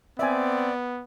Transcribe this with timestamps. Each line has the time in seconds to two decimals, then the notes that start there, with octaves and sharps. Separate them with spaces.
0.19 B3 C4 D5 E5 G#5